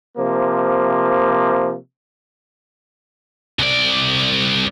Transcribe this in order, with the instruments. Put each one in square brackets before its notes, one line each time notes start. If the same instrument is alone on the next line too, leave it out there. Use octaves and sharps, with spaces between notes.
[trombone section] C3 F3 A#3
[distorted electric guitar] C2 D5